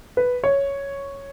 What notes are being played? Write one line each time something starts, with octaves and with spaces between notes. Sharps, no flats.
B4
C#5